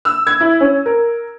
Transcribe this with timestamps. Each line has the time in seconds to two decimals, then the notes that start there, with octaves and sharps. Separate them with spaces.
0.05 E6
0.27 G#6
0.41 E4
0.61 C#4
0.86 A#4